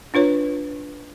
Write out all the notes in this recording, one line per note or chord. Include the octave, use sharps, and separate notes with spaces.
D4 F4 B4 C#5